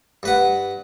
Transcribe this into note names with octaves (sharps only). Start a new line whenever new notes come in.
G2 B4 F#5